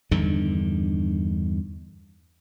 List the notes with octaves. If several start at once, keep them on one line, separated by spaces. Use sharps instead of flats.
E2 G2 D3 D#3